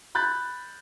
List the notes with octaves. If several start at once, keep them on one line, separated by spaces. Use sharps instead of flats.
B5 F#6 G6 A6